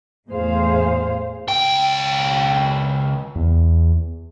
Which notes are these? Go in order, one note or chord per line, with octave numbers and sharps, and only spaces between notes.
E2 A2 A3 G#4 C5 F5
C#2 G5
E2